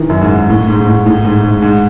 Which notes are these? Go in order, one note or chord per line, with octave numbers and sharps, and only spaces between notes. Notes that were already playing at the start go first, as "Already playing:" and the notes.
Already playing: D#3 E3
F#2
G#2
A2
G#2
G#2
A2
A2
G#2
G#2
G#2